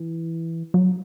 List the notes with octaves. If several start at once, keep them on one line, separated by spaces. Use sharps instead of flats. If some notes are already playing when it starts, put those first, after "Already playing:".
Already playing: E3
F#3